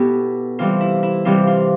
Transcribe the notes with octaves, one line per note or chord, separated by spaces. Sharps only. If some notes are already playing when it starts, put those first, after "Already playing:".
Already playing: B2 B3 E4 G4 A4
C3 E3 G3 F4
E4
E4
C3 E3 G3 F4
F4